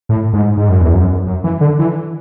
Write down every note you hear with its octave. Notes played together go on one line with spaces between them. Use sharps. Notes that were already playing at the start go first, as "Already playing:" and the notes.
A2
G#2
G#2
F#2
E2
F#2
F#2
E3
D3
E3